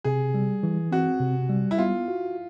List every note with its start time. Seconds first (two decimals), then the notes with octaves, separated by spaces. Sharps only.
0.04 C3 G#4
0.34 G3
0.63 E3
0.92 C4 F#4
1.20 C3
1.49 G3
1.71 E4
1.78 B3 F4
2.08 F#4